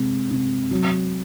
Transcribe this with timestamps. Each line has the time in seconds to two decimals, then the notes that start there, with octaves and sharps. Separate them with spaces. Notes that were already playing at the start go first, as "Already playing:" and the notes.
Already playing: C3 G#3
0.31 C3
0.71 F#3